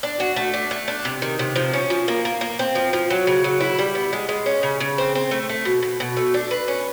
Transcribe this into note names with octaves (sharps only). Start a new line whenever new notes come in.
D4
F#4
A3
D4
A3
D4
C3
D#3
C3
F3
C#4
F3
A#3
A#3
A#3
C4
F3
F3
F#3
C#3
F#3
E4
G3
B3
G#3
G#3
C#4
C#3
C#3
C4
C4
A3
A3
B2
B2
B2
A3
D4
B4
C#4